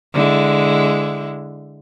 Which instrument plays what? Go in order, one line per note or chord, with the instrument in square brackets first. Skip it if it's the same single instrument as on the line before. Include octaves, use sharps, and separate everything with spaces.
[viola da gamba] D3 G#3 E4